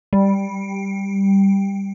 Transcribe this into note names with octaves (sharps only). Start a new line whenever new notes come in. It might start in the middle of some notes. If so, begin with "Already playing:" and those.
G3